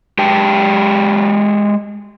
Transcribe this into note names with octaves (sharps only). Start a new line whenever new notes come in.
G#3 G4 G5 A5